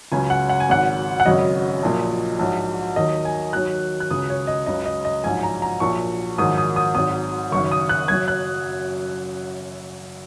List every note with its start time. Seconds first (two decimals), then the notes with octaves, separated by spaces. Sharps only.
0.12 C#2 C#3 F#3 G#5
0.30 F#5
0.49 F#5
0.60 G#5
0.69 G#1 G#2 F#3 F#5
1.20 F#5
1.26 G#1 F#2 C#3 F#3 D#5
1.83 A#1 A#2 F#3
2.39 A#1 G#2 F#3
2.96 D#2 D#3 F#3 D#5
3.25 G#5
3.53 D#2 D#3 F#3 F#6
4.00 F#6
4.11 C#2 C#3 F#3 D#6
4.30 C#5
4.47 D#5
4.66 C#2 C#3 F#3 D#5
4.86 D#5
5.05 D#5
5.24 A#1 G#2 F#3 G#5
5.43 A#5
5.62 A#5
5.80 A#1 A#2 F#3 C#6
6.38 A#1 G#2 D#3 F#3 D#6
6.58 D#6
6.76 D#6
6.94 G#1 G#2 F#3 D#6
7.51 F#1 F#2 D#3 C#6
7.71 D#6
7.89 F#6
8.08 F#1 F#2 F#3 G#6
8.28 F#6